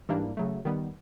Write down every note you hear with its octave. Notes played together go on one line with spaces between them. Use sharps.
G#2 E3 G3 A#3 D4
C#3 F#3 A3
D#3 G3 B3